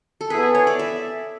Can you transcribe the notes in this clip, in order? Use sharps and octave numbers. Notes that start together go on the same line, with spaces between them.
A4
B3 E4 G#4 B4
B4
C#5
D5
E5